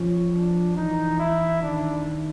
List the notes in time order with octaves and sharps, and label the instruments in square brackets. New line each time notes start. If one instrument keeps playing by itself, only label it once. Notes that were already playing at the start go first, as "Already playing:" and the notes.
Already playing: [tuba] F3 [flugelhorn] C#4
[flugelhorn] D4
[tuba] E3 [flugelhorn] D#4
[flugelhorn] E4
[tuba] D#3 [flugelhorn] D4